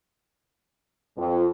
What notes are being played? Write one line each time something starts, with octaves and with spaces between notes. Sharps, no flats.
F2